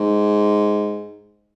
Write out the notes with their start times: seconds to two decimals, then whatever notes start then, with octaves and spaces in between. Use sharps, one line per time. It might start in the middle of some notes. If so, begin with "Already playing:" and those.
Already playing: G#2